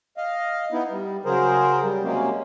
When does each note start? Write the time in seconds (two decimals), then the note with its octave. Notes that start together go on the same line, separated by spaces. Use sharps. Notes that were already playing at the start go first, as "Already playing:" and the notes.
0.17 D#5 F5
0.72 B3 D#4 E4
0.90 G3
1.25 C#3 F#3 G#4 A#4 C5
1.82 G3
2.03 C3 F#3 G#3 A#3 C#4